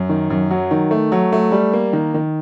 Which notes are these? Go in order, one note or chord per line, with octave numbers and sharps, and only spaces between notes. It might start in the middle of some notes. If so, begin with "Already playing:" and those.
Already playing: F#2
D#3
F#2
F#3
D#3
A3
F#3
A3
G3
A#3
D#3
D#3